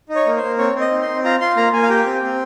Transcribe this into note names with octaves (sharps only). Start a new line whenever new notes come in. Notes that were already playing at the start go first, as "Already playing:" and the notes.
D#4
C#5
A#3
C5
A#3
C4 C#5
C4
D#5
D#4
C6
C4
F4 A#5
F4 C6
A#3 A#5
A#3 G#5
F5
G4 G5
C4
C4